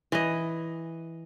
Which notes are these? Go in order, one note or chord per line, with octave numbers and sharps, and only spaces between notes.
E3 D#5